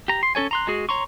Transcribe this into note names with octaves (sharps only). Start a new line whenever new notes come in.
G4 A#5
C6
C#4 A4 C#5 G#5
A#5 C6 F#6
G#3 F#4 G#4
C#5 A#5 C6 C#6